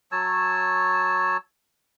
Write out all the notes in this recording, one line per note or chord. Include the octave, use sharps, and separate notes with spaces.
F#3 C#5 A5 E6